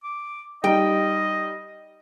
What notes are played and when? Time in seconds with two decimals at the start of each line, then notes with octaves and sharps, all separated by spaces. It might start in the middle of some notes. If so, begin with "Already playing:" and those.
0.04 D6
0.64 G3 D#4 D#5 G5